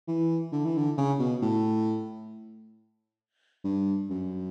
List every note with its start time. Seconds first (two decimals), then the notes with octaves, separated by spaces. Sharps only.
0.08 E3
0.53 D3
0.65 E3
0.77 D3
0.98 C#3
1.19 B2
1.42 A2
3.65 G2
4.10 F#2